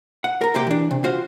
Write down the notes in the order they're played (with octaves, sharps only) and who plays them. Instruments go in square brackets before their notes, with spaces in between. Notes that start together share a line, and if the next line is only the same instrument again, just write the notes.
[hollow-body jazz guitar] F#5
A#4 A#5
B1 C3 A#3 G4 G5
E3 D4
C3
F4 F#4 C5 F5